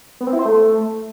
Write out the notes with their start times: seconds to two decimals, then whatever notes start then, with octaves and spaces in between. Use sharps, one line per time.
0.21 B3
0.27 C4
0.33 E4
0.39 C5
0.45 A3